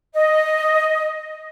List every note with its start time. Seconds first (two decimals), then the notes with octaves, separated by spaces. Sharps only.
0.15 D#5